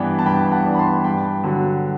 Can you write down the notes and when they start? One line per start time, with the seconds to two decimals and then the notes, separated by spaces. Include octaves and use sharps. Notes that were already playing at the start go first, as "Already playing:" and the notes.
Already playing: G2 E3 B3 D4 G5
0.19 A5
0.26 G2 G5 B5
0.52 F#5 A5
0.65 E3 B3 D4
0.74 B5
0.78 A5 C6
1.04 G2 G5 B5
1.44 D3 F#3